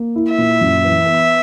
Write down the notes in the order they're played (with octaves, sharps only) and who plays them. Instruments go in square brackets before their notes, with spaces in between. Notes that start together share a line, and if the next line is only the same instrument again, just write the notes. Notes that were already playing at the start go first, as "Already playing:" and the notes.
Already playing: [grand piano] A#3
E4
[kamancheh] E5
[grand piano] A#2
F#2
E3
B3